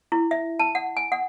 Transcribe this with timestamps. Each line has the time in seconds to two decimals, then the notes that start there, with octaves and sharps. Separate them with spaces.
0.12 E4
0.31 E5
0.59 A5
0.75 F#5
0.97 G#5
1.12 F#5